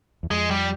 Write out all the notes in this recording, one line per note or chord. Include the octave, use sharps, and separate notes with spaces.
E2
F2 G#3
G3